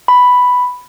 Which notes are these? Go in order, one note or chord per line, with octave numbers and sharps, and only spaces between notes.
B5